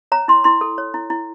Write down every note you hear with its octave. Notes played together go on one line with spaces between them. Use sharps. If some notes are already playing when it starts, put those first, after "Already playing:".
C#5 A#5
E4 C6
E4 C6
A4
C#5
E4
E4